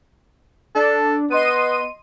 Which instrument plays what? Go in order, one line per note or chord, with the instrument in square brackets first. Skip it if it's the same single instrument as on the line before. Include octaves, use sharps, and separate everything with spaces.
[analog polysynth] D4 [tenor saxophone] A4
[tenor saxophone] B3 [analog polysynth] D#5 C6 D#7